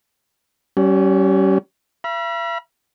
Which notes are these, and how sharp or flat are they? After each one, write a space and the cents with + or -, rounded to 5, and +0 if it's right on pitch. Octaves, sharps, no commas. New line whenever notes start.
G3 -35 C#4 +0
E5 +45 B5 -40